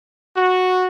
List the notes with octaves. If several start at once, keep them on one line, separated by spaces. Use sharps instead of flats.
F#4